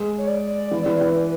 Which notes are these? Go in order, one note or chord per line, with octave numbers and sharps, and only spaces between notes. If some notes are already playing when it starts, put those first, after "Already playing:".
Already playing: G#3
C#5
D5
E3
E3
E3
B4